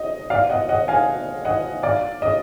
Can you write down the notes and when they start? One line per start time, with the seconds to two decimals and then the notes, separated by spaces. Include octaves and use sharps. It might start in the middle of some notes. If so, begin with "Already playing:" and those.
Already playing: D#5
0.30 D5 F5
0.50 D#5 F#5
0.69 D#5 F#5
0.88 F5 G#5
1.45 D#5 F#5
1.83 D5 F5
2.22 D#5